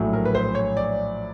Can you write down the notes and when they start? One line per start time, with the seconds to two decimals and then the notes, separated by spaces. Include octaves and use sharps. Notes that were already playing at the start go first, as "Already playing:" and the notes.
Already playing: A#1 A2 F#3 A3
0.13 A#4
0.25 B4
0.35 C5
0.55 C#5
0.77 D5